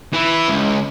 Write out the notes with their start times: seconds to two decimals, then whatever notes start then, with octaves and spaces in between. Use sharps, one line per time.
0.13 E3 E4
0.48 C#2